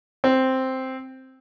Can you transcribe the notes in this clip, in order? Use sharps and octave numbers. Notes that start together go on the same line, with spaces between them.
C4